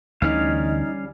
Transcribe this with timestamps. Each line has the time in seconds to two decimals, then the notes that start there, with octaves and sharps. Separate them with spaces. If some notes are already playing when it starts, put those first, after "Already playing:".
0.22 D2 D3 E3 G3 C#4 D#4 F5